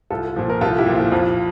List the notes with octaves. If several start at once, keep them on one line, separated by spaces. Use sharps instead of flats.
C2 F4 A4
A#2 F3
A#4
C2 F4 A4
E4 G4
A#2 F3
F4
F2 F4